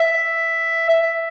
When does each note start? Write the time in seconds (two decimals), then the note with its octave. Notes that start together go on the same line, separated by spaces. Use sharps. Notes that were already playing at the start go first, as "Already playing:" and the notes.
Already playing: E5
0.89 E5